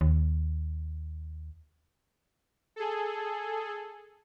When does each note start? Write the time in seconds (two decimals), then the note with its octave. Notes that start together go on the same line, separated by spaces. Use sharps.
0.01 D#2
2.76 G#4 A4